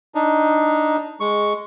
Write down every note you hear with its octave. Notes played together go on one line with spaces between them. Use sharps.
D4 D#4
G#3 C#6